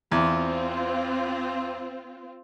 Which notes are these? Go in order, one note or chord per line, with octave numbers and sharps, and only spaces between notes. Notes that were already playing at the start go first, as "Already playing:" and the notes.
E2 C4 F4